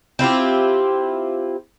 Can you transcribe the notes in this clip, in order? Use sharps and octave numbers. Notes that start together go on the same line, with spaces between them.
C4 E4 F4 G4